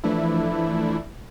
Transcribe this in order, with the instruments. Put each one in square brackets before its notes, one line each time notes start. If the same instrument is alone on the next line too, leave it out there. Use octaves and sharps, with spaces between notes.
[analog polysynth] E3 F3 A3 D4 E4